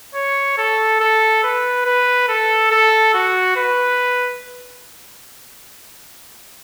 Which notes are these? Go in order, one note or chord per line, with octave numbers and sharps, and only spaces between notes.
C#5
A4
A4
B4
B4
A4
A4
F#4
B4